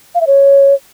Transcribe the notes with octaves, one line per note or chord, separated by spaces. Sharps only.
F5
E5
C#5